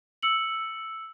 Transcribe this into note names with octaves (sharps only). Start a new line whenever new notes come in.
E6 C#7 F#7